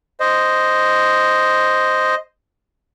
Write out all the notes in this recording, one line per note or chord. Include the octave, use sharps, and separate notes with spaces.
C5 D#5